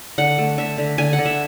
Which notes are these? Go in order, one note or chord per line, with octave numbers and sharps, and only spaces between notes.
D3 F#5
A3
D3 E5
D3
D3 G#5
F#5
D3
E5